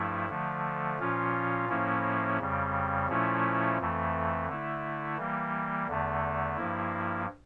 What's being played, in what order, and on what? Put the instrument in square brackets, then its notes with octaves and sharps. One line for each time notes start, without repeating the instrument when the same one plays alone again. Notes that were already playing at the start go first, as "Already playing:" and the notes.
Already playing: [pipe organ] G2 F3 A3 E4
D3 F3 A3
A#2 F3 C#4 F4
A2 F3 A#3 C#4 E4
F2 C#3 G3
A#2 F3 A3 C#4 E4
F2 E3 A3
D3 A3 E4
E3 G3 A#3
E2 D3 A3
G2 F3 A#3 E4